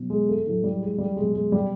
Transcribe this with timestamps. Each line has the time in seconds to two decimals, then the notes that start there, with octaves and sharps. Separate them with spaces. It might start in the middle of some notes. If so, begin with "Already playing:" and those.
Already playing: B2 F#3
0.10 G#3
0.28 A3
0.45 A2 F#3 A3
0.64 G3
0.82 G#3
0.98 G3
1.16 B2 F#3 G#3
1.34 G#3
1.52 G3